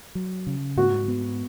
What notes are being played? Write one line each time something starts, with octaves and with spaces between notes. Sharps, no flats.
F#3
C#3
G#2 F#4
B3